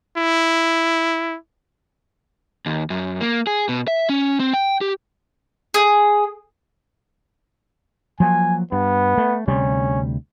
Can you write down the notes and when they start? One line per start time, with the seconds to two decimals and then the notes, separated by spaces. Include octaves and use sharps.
0.18 E4
2.66 D#2
2.90 F#2
3.21 A#3
3.47 G#4
3.69 B2
3.88 E5
4.09 C#4
4.40 C4
4.53 G5
4.81 G4
5.74 G#4
8.20 F3 F#3 A#3 G#5
8.72 G2 B3
9.18 A3
9.48 D2 C3 G3 C#4